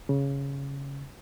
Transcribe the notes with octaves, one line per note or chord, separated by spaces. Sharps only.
C#3